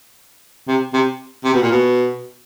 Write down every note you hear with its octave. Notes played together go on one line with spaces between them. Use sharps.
C3
C3
C3
B2
A#2
B2